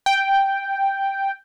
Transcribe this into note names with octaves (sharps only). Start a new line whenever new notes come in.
G5